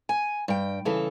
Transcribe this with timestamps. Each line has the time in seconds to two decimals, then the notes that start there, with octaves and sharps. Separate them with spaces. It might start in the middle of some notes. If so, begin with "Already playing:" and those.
0.09 G#5
0.48 G2 G5
0.85 C#3 E3 A4